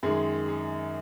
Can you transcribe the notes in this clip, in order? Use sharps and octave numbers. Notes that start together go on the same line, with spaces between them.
F#2 D#3 G#3 G#4
G#4